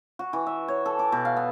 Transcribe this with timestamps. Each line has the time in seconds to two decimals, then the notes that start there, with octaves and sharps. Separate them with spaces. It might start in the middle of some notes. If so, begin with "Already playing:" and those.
0.19 F#4
0.33 E3
0.47 E5
0.68 C#5
0.86 A4
0.99 D6
1.12 B2
1.25 F5
1.36 B3